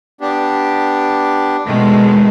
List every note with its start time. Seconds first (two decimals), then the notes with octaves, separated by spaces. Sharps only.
0.21 B3 D4 G4
1.65 B2 D#3 G#3 A3